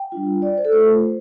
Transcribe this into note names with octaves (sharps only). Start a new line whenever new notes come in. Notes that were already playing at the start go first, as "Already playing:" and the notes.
Already playing: G5
G3 D4 F4
D5
C5
A4
A3 F4 C5